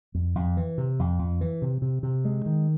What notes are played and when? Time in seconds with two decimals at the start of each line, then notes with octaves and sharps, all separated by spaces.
0.14 F2
0.35 F2
0.57 E3
0.78 C3
0.99 F2
1.19 F2
1.41 E3
1.62 C3
1.82 C3
2.03 C3
2.25 G#3
2.46 D#3